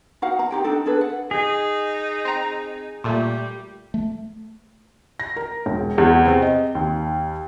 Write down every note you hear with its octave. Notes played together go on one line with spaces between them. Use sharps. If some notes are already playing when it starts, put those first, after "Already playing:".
D#4 F#4 F5 F#5
A#5
D#4 F4 G4 G5
D4 D#4 A4
D4 G#4 A4 B4
F#5
D#4 G#4
C4 A#5
A#2 G3 A3
A3
A#6
A#4
E1
E2
C3
D#5
D#2